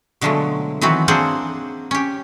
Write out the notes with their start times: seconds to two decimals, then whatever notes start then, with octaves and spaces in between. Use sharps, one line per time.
0.21 B2 D3 F3 F#3 G#3 A3
0.81 D#3 E3 F#3 C4 F#4 B4
1.08 A#3 C4 D4 G#4 C5 F#5
1.91 C#4 G4